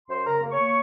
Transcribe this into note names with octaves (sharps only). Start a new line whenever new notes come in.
F#2 C5 C6
C#3 A#4 A#5
A#3
C#5 C#6
A#3